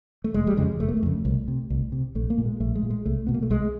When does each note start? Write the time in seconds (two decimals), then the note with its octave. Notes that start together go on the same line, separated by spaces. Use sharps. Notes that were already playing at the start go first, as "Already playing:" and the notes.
0.24 A3
0.34 F1 G#3
0.47 G3
0.57 F2 C#3 G#3
0.80 F1 A3
0.88 A#3
0.97 A3
1.03 F2 C#3
1.25 C2
1.48 C3
1.70 C2
1.92 C3
2.15 A#1 A3
2.30 A#3
2.38 A#2
2.45 G#3
2.60 A#1 A3
2.75 G#3
2.83 A#2
2.90 G#3
3.05 C2 A3
3.27 B2 B3
3.34 A#3
3.42 A3
3.50 C2 G#3